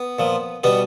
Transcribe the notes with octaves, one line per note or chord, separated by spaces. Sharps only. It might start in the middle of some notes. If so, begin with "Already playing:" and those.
Already playing: B3
A#2 F3
B2 G3 B3